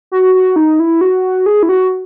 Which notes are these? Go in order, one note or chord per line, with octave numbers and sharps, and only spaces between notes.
F#4
F#4
D#4
E4
F#4
G#4
E4
F#4